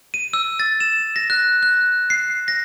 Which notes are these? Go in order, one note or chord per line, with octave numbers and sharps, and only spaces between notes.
D#7
E6
A6
E7
A#6
F#6
F#6
C7
A#6